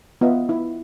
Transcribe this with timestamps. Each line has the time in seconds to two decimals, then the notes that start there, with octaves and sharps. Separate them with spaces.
0.21 B3 F4 D#5 E5
0.49 E4